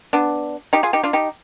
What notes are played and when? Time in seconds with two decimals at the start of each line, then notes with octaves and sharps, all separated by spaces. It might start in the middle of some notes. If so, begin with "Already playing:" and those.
0.13 B3 D4
0.73 D#4 G4
0.83 F4 G#4
0.93 D#4 G4
1.03 D4 F4
1.13 D#4 G4